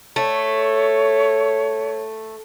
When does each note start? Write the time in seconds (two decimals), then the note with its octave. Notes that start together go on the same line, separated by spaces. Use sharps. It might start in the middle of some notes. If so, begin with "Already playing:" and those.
0.16 A3 C#5